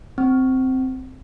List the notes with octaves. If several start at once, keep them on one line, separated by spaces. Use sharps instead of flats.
C4